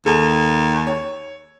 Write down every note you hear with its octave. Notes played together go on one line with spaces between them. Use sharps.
D#2 A4
C#5